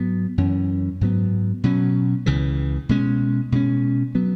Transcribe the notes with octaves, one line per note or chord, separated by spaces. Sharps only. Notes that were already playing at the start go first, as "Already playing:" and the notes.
Already playing: G#2 F#3 B3
F#2 E3 C#4
G#2 F#3 B3
B2 F#3 C#4
C#2 C#3 E3
B2 G#3 C#4
B2 G#3 C#4
F#3 B3